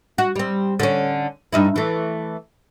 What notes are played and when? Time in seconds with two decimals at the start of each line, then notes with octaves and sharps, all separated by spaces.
0.18 F#4
0.36 G3 C4
0.79 D3 C#4
1.53 G2 D#4 E4
1.76 E3 A3